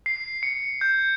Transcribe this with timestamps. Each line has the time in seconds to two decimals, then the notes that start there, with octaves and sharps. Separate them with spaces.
0.06 C7
0.43 C#7
0.81 G6